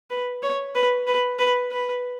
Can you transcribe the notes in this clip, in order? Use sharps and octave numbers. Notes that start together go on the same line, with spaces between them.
B4
C#5
B4
B4
B4
B4